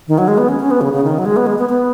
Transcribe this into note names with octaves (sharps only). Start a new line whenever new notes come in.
D#3
F#3
G#3
B3
C#4
C#4
B3
C#3
C#3
D#3
F#3
G#3
B3
G#3
B3
B3